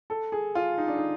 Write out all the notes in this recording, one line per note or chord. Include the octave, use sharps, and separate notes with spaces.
A4
G#4
F4
D#4
D4
D#4